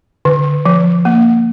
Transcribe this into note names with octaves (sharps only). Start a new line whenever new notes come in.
D3
F3
A#3